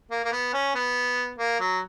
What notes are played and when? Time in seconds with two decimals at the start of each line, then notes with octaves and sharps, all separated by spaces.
0.11 A#3
0.24 A#3
0.32 B3
0.53 C#4
0.75 B3
1.39 A#3
1.60 F#3